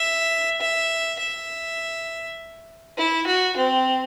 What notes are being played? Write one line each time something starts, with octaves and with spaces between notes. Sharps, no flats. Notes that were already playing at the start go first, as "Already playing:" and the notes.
Already playing: E5
E5
E5
E4
F#4
C4